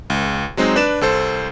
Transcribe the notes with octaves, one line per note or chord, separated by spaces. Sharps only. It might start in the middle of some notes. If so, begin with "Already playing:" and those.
C#2
F#3 G#3 C4 D#4
D4 B4 D5 E7
C2 A4 C5